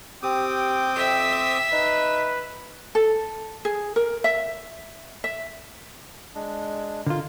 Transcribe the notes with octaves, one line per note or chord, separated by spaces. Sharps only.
C4 G4 G5 D6 D#6
F2 E5
D#4 B4
A4
G#4
A#4
E5
E5
G#3 D4
D3 F4 A#4